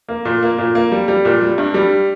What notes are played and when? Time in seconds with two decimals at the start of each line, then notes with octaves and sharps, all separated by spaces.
0.08 A#3
0.25 A#2
0.43 A#3
0.58 A#2
0.75 A#3
0.92 G3
1.08 G3
1.25 A#2
1.41 G3
1.58 G2
1.74 G3